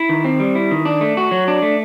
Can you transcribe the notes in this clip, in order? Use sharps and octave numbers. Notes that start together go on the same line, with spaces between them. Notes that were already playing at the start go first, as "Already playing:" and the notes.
Already playing: E4
D#3
C4
G3
E4
D#3
D4
A3
F#4
F#3
D4
A3